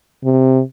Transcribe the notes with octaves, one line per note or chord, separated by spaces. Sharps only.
C3